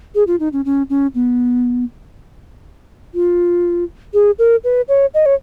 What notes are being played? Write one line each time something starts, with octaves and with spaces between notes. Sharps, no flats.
G#4
F4
D#4
C#4
C#4
C#4
B3
F4
G#4
A#4
B4
C#5
D#5
C#5